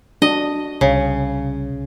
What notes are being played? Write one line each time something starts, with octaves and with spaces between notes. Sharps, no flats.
D4 F#4 D#5
C2 C#3